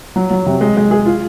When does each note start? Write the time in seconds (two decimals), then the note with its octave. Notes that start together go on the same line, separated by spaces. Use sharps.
0.16 F#3
0.31 F#3
0.46 C3
0.61 G#3
0.77 G#3
0.91 G#4
1.06 F4